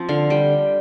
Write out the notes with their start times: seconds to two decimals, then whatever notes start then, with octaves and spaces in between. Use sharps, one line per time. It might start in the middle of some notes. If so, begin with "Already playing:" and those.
Already playing: F3 C4
0.09 D3 F5
0.30 G3 G5